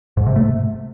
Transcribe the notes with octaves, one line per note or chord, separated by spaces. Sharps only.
G#2
C3
A3